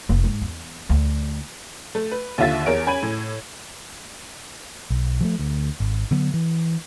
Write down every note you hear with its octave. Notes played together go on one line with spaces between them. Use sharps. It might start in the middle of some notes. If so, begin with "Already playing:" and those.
F1
G#2
E2
D2
A3
B4
D#2 D3 F4 E5 A6
E2 A#4 C#5 D7
C#4 G#5 B5 G#6 D#7
A2
B1
F3 G3 A3
D2
G#1
D3 F#3 B3
E3